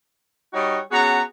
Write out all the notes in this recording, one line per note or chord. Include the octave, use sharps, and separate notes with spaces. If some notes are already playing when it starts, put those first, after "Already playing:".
G3 D#4 F#4 C#5 D#5
B3 C#4 F#4 G#4 A#5